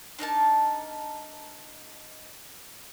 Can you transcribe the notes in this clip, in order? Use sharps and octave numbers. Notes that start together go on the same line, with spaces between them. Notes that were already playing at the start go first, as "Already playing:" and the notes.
D4 D#4 A#4 A5